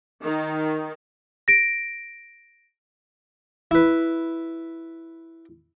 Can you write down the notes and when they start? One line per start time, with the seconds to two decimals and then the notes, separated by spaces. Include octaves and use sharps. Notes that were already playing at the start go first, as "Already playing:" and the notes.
0.24 D#3
1.48 A#6 D7
3.71 E4 B4